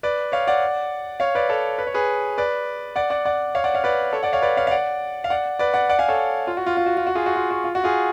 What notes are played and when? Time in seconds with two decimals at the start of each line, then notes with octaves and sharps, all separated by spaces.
0.03 B4 D5
0.32 C#5 F5
0.47 D5 F#5
1.20 C#5 F5
1.35 B4 D5
1.49 A4 C#5
1.78 B4
1.87 C#5
1.94 G#4 B4
2.38 B4 D5
2.96 D5 F#5
3.10 D5 F#5
3.25 D5 F#5
3.55 C#5 F5
3.64 D5 F#5
3.74 C#5 F5
3.84 B4 D5
4.13 A4 C#5
4.23 D5 F#5
4.33 C#5 F5
4.42 B4 D5
4.57 C#5 F5
4.67 F5
4.71 D5 F#5
5.24 F5
5.30 D5 F#5
5.59 B4 D5
5.74 D5 F#5
5.89 D5 F#5
5.99 F5 G#5
6.08 A4 C#5
6.47 F4
6.57 F#4
6.66 F4
6.77 F4
6.86 F#4
6.97 F4
7.07 F#4
7.15 F4 G#4
7.26 F#4
7.36 F4
7.51 F#4
7.64 F4
7.75 F#4
7.84 F4 G#4